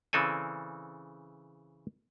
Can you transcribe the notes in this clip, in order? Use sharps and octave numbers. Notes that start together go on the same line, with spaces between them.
C#3 E3 C4 A4 D5 G#5